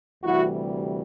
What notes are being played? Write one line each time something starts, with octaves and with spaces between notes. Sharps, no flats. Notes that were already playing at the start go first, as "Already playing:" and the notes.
D2 C3 E3 G3 E4 F#4